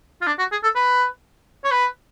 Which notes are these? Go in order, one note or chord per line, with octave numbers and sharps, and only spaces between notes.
F4
D4
F#4
G#4
A4
B4
C#5
B4